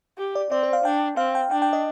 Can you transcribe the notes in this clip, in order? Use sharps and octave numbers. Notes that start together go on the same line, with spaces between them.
G4
D5
C4 D5
C5
F5
D4 G5
C4 F5
G5
D4 G5
G5
D#5